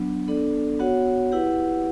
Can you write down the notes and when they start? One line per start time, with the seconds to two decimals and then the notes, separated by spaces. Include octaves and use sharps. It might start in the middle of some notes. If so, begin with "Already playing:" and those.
Already playing: F#3 B3 D4
0.28 B3 D4 A4 D5
0.79 B3 F#4 C#5 F#5
1.32 E4 G4 B4 F#5